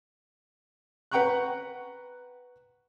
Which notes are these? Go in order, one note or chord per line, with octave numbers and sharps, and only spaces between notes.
B4 F#5 G5 A#5 C#6 F#6